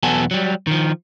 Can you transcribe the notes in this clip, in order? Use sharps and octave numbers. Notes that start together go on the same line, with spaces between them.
B1 E2 B3 F#4 A4 G#5
F#3 G3
D#3 F3